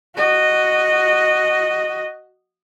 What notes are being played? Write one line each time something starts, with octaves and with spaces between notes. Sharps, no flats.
F#4 D#5